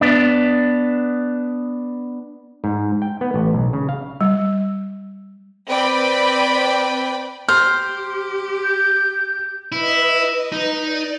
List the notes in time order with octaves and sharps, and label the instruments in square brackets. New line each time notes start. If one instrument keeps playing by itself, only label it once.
[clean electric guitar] B3 D4
[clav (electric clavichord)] G#2
G5
B3
A1
B1
C#3
F5
[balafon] G3
[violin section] C4 B4 D5 G5 B5
[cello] G4 [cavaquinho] C5 [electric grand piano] F6
[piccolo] G6
[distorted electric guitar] E4 [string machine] B4 D#5
[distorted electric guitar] D#4
[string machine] D5